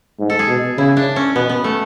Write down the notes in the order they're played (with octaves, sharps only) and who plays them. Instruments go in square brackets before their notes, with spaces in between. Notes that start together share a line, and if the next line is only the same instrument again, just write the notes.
[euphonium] G#2
[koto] A4
G#4
[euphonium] B2
[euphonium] C#3 [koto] E4
[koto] D4
C#4
[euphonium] B2 [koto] B3
[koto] B3
A3